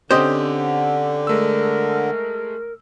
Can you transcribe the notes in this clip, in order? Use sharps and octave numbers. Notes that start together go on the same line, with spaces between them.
D3 C4 C#4 G4 C5 D#5
G#3 A3 A#4 E6